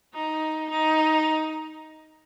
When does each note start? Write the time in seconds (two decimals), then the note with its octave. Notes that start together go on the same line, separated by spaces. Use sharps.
0.15 D#4
0.70 D#4